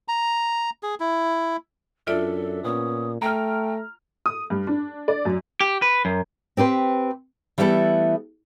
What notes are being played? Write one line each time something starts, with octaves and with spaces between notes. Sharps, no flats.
A#5
G#4
E4
F#2 D4 F4 A4 D5 E5
A#2 B3 C#4 D#6
A3 G5 A#5 F6
D#6
G2
D4
D5
F#2
G4
B4
F#2
C4 G4 B4 C5
E3 G3 A3 B3 E4 A4